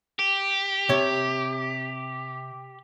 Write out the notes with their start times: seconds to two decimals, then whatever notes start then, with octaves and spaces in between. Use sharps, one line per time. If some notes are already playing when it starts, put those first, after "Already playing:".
0.19 G4
0.89 C3 C#5